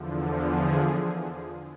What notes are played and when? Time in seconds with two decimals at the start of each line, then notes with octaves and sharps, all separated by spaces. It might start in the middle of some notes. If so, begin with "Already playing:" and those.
Already playing: E2 D3 F3
0.16 A4
0.45 G#4